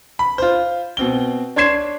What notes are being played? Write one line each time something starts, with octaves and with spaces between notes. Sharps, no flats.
B5
F4 C5
B2 C4 G7
D4 C#5 C6 G#6 C7 E7